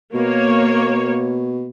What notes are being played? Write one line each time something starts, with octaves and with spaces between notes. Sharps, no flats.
B2 A#3 C#5